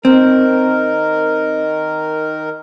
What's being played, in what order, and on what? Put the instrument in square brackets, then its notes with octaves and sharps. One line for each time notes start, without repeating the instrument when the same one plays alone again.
[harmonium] D#3 A#4 [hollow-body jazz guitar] C4